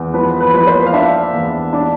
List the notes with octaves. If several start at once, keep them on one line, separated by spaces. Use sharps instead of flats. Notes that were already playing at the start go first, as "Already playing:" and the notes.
Already playing: E2
F3 B4
B4
F3 B4
C5
F5
D4 E5
E2
D4